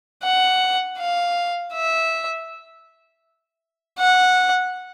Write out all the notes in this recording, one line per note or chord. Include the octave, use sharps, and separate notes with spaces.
F#5
F5
E5
F#5